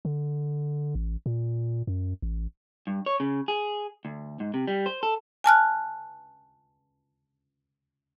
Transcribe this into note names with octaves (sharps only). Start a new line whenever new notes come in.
D3
A1
A#2
F#2
A1
G2
C#5
C#3
G#4
D2
G#2
C3
G3
C5
A4
G#5 A5 F6 F#6